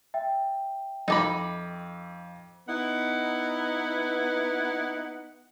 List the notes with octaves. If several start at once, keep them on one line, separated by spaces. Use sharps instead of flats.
E5 G5
F2 D#4 A5 B5 D6
B3 D#4 E4 B4 F#5